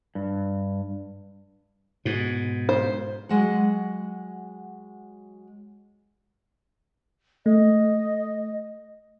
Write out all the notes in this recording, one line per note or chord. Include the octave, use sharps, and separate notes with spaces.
G2
G#2 B2
C5
F#3 G#3 F#5
A3 D#5